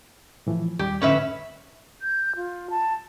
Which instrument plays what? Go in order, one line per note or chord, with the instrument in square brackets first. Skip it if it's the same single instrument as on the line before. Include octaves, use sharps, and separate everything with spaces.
[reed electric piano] A2 E3 F3
[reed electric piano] D#2 G3 [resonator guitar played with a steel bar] G4
[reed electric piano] F2 A2 D3 [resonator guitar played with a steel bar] C#4 B4 E5
[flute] G6
F4
A5